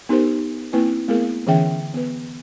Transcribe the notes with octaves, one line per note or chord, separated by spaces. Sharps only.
B3 D#4 G4 A#4 C5
A#3 C4 E4 B4 G#5
A3 B3 E4 G#4 A#4 F5
D3 E3 C#4 G#4 E5 G5
B3 B4